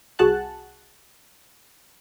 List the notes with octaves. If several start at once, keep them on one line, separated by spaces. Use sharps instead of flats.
C2 F#4 G#4 F#5 A5 F#6